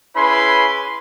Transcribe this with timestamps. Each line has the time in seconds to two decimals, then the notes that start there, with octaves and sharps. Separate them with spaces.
0.16 C#4 E4 G#4 B4 B5 C6